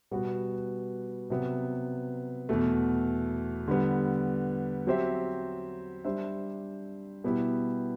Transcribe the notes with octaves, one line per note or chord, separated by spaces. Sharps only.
B2 G3 B3 F#4 B4
C3 F#3 B3
E2 B2 A3
D3 G3 B3
F#3 C4 G4 C5 E5
G3 D4 G4 C5 E5
B2 G3 B3 E4 G4